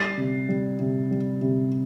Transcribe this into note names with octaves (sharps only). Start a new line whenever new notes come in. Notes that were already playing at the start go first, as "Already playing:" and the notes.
Already playing: G3 A6 C7
C3
G3
C3
G3
C3